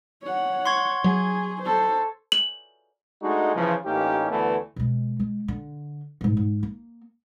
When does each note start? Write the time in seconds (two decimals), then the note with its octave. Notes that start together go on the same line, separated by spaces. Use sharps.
0.23 C#5 F#5
0.65 C6 C#6 G#6
1.04 F#3 G#4
1.61 A4 C5
2.32 F#7
3.22 G#3 A3 D4 D#4 F#4
3.54 C#3 E3 F3
3.86 A1 A#3 C#4 D#4 G4
4.30 D2 D3 E3 A3 B3
4.76 B2 G#3
5.19 G#3
5.48 D3
6.21 A1 G#2
6.37 G#2
6.63 A#3